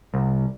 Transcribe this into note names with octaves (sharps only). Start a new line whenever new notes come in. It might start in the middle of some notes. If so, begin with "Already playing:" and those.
C2